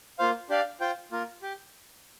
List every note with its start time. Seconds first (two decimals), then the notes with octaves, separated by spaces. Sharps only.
0.19 A#3 F4 C5 F5
0.50 D4 G4 D5 F5
0.80 F4 C5 G5
1.12 A#3 F4 A#4
1.42 G4